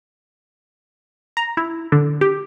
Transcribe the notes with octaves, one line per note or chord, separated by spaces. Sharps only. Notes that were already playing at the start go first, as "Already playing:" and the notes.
A#5
E4
D3
G4